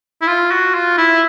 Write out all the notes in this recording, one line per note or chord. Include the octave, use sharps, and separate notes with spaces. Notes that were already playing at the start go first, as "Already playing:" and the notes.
E4
F4
F#4
F4
E4